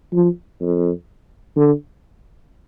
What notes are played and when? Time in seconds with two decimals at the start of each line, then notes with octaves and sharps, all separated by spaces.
0.13 F3
0.61 F2
1.57 D3